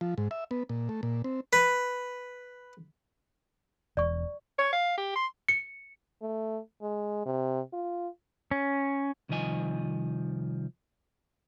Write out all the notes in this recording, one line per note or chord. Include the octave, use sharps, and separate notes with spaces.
F3
G#2
E5
B3
A#2
A3
A#2
C4
B4
E1 D5 C#6
C#5
F5
G4
C6
C#7
A3
G#3
C3
F4
C#4
C2 D#3 F3 D#5 G#5